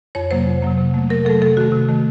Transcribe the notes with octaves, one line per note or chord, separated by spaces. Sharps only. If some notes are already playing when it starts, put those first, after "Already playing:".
F2 C#5
C3 F#3 A#3 C5
F2
C3 F#3 A#3
C3
F#3 A3
C3 A#4
F#3 A3 A4
C3 A4
D#3 A3 F#4
C3
D#3 A3